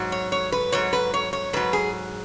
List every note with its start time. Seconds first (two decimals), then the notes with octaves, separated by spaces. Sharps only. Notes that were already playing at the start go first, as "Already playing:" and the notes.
Already playing: G#2 F#3
0.12 C#5
0.32 C#5
0.52 B4
0.72 G#2 F#3 C#5
0.93 B4
1.14 C#5
1.33 C#5
1.53 G#2 F#3 B4
1.73 G#4